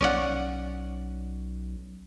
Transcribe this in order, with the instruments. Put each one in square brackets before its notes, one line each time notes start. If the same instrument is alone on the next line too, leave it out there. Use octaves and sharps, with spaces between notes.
[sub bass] B1 [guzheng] C#4 D5 F#5